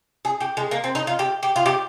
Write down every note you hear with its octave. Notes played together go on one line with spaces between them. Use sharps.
G#4
G4
G#3
A#3
C4
D#4
F4
G4
G4
F4
G4